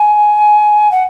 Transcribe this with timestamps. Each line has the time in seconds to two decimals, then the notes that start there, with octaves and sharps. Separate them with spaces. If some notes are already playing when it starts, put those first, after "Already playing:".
Already playing: G#5
0.91 F#5